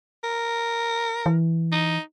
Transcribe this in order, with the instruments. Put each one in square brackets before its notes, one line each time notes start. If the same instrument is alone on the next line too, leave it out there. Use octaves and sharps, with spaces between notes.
[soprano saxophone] A#4
[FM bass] E3
[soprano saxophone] D#4